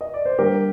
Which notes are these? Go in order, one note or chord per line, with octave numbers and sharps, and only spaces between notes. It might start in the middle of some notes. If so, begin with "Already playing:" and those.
D#5
D5
C5
D3 G3 A#3 G4 A#4